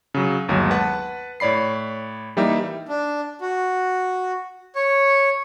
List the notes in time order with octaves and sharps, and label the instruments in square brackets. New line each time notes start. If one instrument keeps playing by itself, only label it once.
[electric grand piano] C#3 F#3
G1 D#2 F#3 G#3 F#4
B4 F#5 A5
A2 C#5 D5 B5 C7
E3 G3 A#3 D#4 G4 E5
[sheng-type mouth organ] D4
F#4
C#5